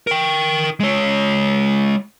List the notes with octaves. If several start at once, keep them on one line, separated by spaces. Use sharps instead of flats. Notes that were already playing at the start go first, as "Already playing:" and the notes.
A#4 G5
G#3 C#5